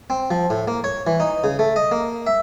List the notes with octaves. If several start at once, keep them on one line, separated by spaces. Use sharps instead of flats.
C4
F3
A2
A#3
C#5
E3
D#4
C#3
A3
D#5
A#3
E5